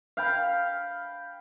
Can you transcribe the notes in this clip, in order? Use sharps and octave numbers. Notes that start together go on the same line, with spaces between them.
F5 G5 B5